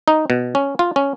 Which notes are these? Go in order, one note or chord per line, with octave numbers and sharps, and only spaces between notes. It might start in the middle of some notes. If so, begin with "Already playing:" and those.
D#4
B2
C#4
F4
C#4